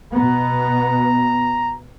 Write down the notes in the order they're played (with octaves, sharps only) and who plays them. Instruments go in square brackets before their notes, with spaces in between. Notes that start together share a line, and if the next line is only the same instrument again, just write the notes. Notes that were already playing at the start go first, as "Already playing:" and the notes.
[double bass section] B2 B3 [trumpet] A#5